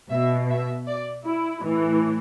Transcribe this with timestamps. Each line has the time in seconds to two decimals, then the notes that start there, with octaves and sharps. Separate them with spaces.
0.11 B2 E5
0.50 E5
0.87 D5
1.25 E4
1.63 A2 E3